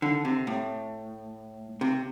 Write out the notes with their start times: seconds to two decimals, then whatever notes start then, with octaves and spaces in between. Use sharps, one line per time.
0.02 D3
0.25 C3
0.47 A2
1.81 C3